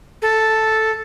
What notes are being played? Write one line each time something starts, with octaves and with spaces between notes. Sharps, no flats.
A4